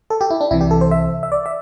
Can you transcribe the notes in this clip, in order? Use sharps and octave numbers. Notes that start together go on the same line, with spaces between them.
A4
G4
E4
D4
C2 C3 E3 E4
G4
A4
C5
E5
E5
D5
E5